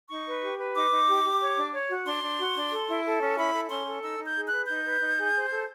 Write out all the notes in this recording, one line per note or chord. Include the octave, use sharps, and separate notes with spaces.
D#4 C#6
B4
G4
B4
D#4 D6
D#4
G4
G4
C#5
D4
C#5
F#4
D4 C6
D4
F#4
D4
A4
E4
A4
C#4
E4 B5
A4
C#4 C6
A4
D#4 E6
D#4
G6
G#4
F#6
B4
D#4 G6
B4
D#4
G#4
C5
A4